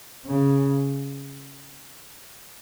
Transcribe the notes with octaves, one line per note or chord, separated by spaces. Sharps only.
C#3